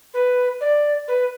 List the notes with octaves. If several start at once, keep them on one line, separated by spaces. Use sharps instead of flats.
B4
D5
B4